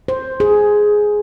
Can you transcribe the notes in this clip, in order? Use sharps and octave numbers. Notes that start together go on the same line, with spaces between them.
C5
G#4